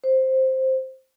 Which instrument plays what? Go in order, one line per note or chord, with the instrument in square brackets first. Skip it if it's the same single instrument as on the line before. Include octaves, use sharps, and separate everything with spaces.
[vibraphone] C5